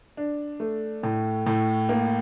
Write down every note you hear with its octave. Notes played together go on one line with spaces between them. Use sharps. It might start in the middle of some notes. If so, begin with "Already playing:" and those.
D4
A3
A2
A2
A#3